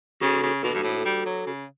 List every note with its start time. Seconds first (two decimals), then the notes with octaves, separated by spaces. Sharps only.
0.21 C#3 F#4 A4
0.43 C#3
0.63 B2 F#4 A4
0.74 G2
0.83 A2
1.05 G3
1.25 F#3
1.46 C#3